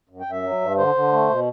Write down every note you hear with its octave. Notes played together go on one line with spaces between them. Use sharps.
F#2
G5
F#2
E5
F#3
G2
D3 C5
D3
A3
B2